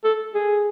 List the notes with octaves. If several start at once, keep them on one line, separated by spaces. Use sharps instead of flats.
A4
G#4